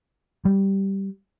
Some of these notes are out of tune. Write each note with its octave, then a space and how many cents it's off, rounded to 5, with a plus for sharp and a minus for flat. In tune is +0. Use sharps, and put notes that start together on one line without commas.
G3 -5